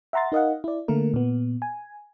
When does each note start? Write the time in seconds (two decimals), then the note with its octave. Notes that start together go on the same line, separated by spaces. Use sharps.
0.13 E5 F#5 A#5 C6 A6
0.32 D#4 A#4 D#5 F5 F#5
0.64 E4 D5
0.88 D3 A3 A#3 A#4
1.14 A#2 B3
1.62 G#5